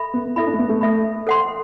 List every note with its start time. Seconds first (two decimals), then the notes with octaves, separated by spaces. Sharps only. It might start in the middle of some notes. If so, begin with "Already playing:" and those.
Already playing: A4 E5 B5
0.14 B3
0.36 E4 A4 E5 B5
0.47 D4
0.53 A3
0.59 B3
0.69 A3
0.81 A4 E5 B5
1.27 A4 C5 F#5 C6